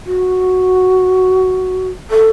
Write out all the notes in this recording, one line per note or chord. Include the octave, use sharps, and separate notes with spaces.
F#4
A4